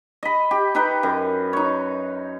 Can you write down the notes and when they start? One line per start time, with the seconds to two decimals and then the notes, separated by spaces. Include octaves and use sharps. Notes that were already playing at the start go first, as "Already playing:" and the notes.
0.23 D#5 B5
0.51 G4
0.75 D#4 B4 G5
1.03 F#2
1.53 D#4 C#5